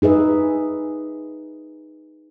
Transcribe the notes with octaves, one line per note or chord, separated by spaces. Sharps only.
D#4 G#4 B4 E5